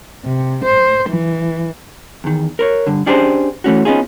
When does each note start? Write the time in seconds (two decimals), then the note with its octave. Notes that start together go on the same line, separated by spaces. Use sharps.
0.23 C3
0.63 C5
1.09 E3
2.24 E2 D#3
2.59 A#4 B4 C#5
2.87 G2 D3
3.06 C#4 D4 G4 G#4 B4 C5
3.64 E3 A3 C#4 F#4
3.85 B3 C#4 D#4 F4 G#4